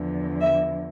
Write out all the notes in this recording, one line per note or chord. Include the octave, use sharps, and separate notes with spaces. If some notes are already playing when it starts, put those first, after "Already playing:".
Already playing: E2 D3 F3
E5